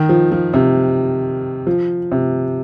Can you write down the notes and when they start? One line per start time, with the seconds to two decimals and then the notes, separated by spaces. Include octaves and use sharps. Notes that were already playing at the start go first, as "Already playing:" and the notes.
Already playing: D#3
0.09 F3
0.32 F3
0.54 C3
1.67 F3
2.12 C3